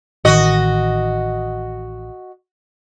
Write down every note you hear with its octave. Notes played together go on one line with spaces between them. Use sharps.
A1 D#3 F#4 D#5